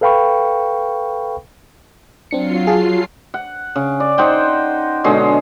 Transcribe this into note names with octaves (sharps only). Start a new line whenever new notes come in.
A4 B4 F5 G5 B5 C#6
F#3 C4 D4 F4 C7 C#7
G#4 F5 A5
F#5
C#3
D5
D#4 C5 F#5 G5
B2 D3 G#3 C#5